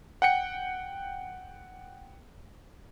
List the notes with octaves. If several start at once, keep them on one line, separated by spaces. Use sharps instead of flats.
F#5 G5 C#7